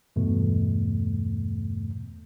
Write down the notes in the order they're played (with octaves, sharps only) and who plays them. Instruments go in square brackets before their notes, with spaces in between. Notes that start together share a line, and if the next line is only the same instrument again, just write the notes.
[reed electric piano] E2 G2 B2 A3